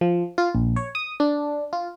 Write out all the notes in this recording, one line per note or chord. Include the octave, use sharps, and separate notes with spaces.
F3
F4
A#1
C#5
D#6
D4
F4